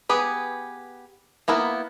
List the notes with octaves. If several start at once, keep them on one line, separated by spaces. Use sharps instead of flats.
B3 G4 G#4 B4
A#3 B3 E4 A#4